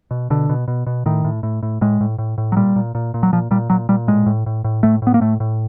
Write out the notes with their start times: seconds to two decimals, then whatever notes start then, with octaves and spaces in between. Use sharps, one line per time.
0.11 B2
0.30 B2 D3
0.49 B2
0.68 B2
0.87 B2
1.06 A2 D#3
1.25 A2
1.43 A2
1.63 A2
1.81 A2 G#3
2.01 A2
2.19 A2
2.38 A2
2.52 F#3
2.56 A#2 G3
2.76 A#2
2.95 A#2
3.14 A#2
3.23 F#3
3.33 A#2 F3
3.51 A#2 G3
3.70 A#2 F#3
3.89 A#2 G3
4.07 A2 G#3
4.26 A2
4.46 A2
4.64 A2
4.83 A2 A3
5.02 A2 B3
5.14 A#3
5.21 A2 A3
5.40 A2